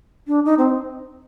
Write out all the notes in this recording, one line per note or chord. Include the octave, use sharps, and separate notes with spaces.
D4
D#4
C4